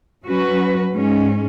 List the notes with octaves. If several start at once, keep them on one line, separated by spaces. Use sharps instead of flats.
F#3 C#4 F#4 B4
G#2 G#3 C#4